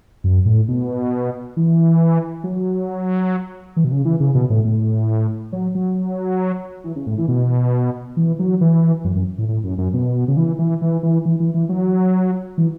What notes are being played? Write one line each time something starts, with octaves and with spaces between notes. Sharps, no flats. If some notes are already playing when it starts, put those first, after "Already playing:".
F#2
A2
B2
E3
F#3
E3
B2
C#3
E3
C#3
B2
A2
A2
F#3
F#3
E3
C#3
A2
E3
B2
E3
F#3
E3
F#2
F#2
A2
A2
F#2
F#2
B2
C#3
E3
E3
E3
E3
E3
E3
E3
F#3
E3